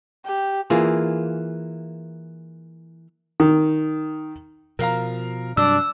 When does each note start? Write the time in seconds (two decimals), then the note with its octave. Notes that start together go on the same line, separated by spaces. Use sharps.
0.25 G4
0.70 E3 A#3 F4 G#4
3.40 D#3
4.79 B2 F3 A#4 F5 A#5
5.57 G2 C3 F#3 D4 E6